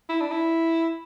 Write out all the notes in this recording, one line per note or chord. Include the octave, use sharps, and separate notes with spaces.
E4
D4
E4